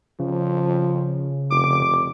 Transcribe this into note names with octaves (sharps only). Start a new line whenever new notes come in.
C#3 F3
F1 D6